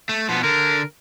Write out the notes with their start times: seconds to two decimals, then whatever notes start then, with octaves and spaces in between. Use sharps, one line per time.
0.09 A3
0.29 B2 F3 B3
0.43 D3 A#4